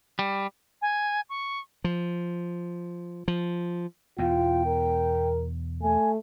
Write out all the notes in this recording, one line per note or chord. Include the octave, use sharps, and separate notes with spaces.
G3
G#5
C#6
F3
F3
E2 B2 E3 F4 G5
A#4
A3 G#5